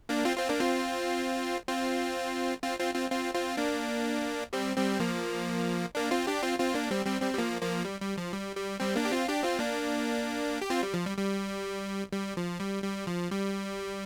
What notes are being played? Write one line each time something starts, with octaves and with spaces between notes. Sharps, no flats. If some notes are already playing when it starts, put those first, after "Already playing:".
A#3 D4
C4 F4
C4 F4
A#3 D4
C4 F4
C4 F4
C4 F4
C4 F4
C4 F4
C4 F4
C4 F4
A#3 D4
G3 C4
G3 C4
F3 A#3
A#3 D4
C4 F4
D4 G4
C4 F4
C4 F4
A#3 D4
G3 C4
G3 C4
G3 C4
G3
F3 A#3
F3 A#3
G3
G3
F3
G3
G3
G3 C4
A#3 D4
G4
C4 F4
D4 G4
C4 F4
A#3 D4
G4
C4 F4
G3
F3
G3
G3
G3
F3
G3
G3
F3
G3